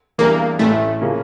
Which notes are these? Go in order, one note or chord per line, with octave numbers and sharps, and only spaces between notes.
E2 E3 G3 A#3 D4
A1 A2 E3 A3
C#3 F3 A#3 C#4